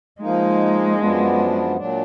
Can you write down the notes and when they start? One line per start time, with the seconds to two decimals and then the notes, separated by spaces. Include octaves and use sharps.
0.21 F3 G#3 A#3 D#4
0.99 F#2 F3 B3 D4
1.76 A#2 F#3 D4